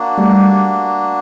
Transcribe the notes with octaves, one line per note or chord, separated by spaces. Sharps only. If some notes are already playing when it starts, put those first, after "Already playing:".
Already playing: A#3 D4 F#4
G3 A3